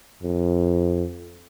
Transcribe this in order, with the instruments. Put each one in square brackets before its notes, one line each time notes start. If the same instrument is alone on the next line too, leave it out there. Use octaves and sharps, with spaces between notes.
[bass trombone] F2